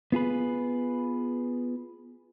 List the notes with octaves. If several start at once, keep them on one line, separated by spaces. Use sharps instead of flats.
B3 F4 G#4 B4